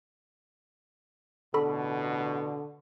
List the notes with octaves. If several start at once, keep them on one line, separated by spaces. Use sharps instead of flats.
A1 B2 D3 A4 B5 C#6